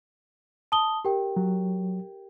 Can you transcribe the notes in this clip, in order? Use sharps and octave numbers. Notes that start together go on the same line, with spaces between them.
A5 D#6 G7
G4 A#4 G5
F#3